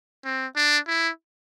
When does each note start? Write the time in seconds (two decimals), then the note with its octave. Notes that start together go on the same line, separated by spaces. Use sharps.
0.25 C4
0.56 D4
0.88 E4